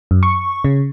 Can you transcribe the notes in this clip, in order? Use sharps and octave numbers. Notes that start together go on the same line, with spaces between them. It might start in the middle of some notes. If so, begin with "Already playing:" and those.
F#2
C#6
C#3